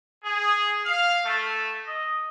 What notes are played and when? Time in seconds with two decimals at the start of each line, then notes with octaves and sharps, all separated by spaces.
0.24 G#4
0.86 F5
1.25 A3
1.85 D#5